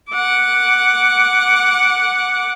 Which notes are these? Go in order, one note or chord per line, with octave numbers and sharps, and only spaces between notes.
F#5 D6